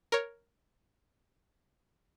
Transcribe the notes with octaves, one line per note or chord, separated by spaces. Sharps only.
A#4 C#5